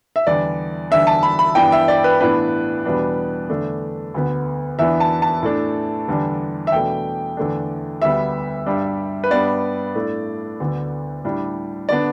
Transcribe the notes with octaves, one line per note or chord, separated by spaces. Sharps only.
E5
E2 D3 G3 D4 D5
E2 D3 G3 D4 E5
A5
B5
B5
G2 E3 B3 D4 G5
E5
D5
B4
A2 E3 B3 D4 B4
E2 B2 G3 B3 D4
E2 D3 A3 D4
D2 D3 B3
E2 E3 B3 D4 E5
A5
A5
A2 A3 D4
E2 D3 G3 D4
E5
E2 B2 A3 D4 G5
E2 D3 A3 D4
D2 D3 G3 B3 E5
G2 G3 D4
B4
G2 G3 B3 D4 D5
A2 A3 D4
D2 D3 B3
A2 G3 D4
D3 B3 D4 D5